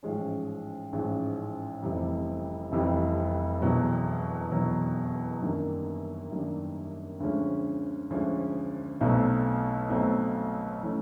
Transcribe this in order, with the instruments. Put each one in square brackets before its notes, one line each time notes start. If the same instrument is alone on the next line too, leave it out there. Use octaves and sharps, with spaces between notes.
[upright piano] A1 G#2 F3 G#3 C#4
A1 G#2 F3 G#3 C#4
F1 F2 C3 E3 G3
F1 F2 C3 E3 G3
E1 E2 B2 F#3
E1 E2 B2 F#3
F#2 D#3 G3 A#3 D4
F#2 D#3 G3 A#3 D4
D2 D3 F3 G#3 C#4
D2 D3 F3 G#3 C#4
B1 B2 F#3 A3 C4
B1 B2 F#3 A3 C4
E3 A3 C#4